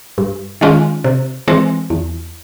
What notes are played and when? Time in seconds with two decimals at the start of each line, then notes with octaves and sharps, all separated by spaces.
0.18 G2
0.61 D#3 G#3 C#4 F4
1.04 C3
1.48 E3 G#3 C4
1.90 E2